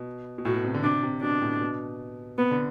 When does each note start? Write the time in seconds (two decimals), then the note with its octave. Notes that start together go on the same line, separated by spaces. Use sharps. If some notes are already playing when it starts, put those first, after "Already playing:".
Already playing: B2
0.38 B2
0.45 A2 F#4
0.54 B2
0.65 C3
0.74 D3
0.84 C3 D4
1.03 C3
1.22 B2 D4
1.42 A2
1.61 B2
2.38 C3 B3
2.51 D3